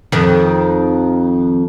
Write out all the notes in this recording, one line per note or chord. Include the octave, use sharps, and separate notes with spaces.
F2 D#3